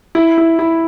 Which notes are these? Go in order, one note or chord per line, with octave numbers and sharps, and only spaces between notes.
E4
E4
E4